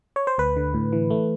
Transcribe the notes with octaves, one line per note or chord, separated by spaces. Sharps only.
C#5
C5
D2 B4
D3
A2
E3
A3